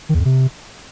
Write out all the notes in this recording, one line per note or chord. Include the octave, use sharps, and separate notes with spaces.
D#3
E2
F2
C3